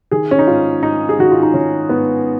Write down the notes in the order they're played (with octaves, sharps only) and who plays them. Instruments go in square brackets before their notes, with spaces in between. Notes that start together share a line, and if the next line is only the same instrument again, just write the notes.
[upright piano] D#3 G#4
C#4
D#4
G#2 F4
G#2 D#4
G#4
D#3 F#4
F4
D#4
D#3 C#4
G#2 B3